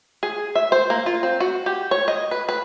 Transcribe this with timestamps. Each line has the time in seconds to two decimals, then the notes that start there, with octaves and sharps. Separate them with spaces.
0.23 G#4
0.55 E5
0.72 C5
0.90 A#3
1.06 F4
1.23 C4
1.40 F#4
1.66 G4
1.91 C#5
2.08 D#5
2.31 B4
2.49 B4